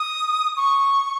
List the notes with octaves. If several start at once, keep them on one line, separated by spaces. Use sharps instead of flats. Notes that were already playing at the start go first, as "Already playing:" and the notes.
Already playing: D#6
C#6